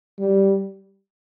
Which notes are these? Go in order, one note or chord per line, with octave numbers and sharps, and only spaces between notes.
G3